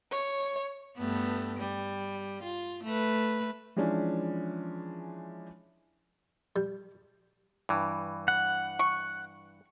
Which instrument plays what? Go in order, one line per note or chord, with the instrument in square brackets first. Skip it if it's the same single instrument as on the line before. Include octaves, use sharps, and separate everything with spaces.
[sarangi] C#5
[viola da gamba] G2 A3 B3
G3
F4
A3 B4
[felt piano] E3 F3 G#3 C#4 D4
[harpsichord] G3
[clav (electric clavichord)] G2 E3
[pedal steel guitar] F#5
[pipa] C#6